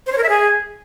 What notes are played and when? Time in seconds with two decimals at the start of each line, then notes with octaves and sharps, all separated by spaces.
0.07 C5
0.12 C#5
0.18 A#4
0.23 E5
0.29 G#4